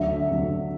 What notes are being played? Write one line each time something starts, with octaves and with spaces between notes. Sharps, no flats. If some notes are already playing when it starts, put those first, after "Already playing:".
Already playing: D2 D3 F#3 E5
D2 D3 F#3